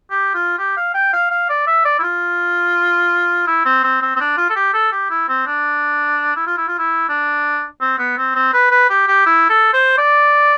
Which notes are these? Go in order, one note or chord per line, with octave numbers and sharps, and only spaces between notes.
G4
F4
G4
F5
G5
F5
F5
D5
E5
D5
E4
F4
E4
C4
C4
C4
C4
D4
F4
A4
G4
A4
G4
E4
C4
D4
E4
F4
E4
F4
E4
D4
C4
B3
C4
C4
B4
B4
G4
G4
E4
A4
C5
D5